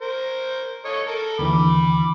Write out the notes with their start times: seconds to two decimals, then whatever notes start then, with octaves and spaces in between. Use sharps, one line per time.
0.02 A#4 C5
0.85 A4 C#5 D#5
1.07 A4 A#4
1.39 D#2 D3 E3 B5 D6